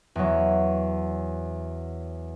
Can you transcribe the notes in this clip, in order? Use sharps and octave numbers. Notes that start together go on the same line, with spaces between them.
E2 F#3